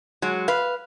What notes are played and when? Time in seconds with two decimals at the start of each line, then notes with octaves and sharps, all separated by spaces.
0.22 F#3 G#3
0.48 B4 F5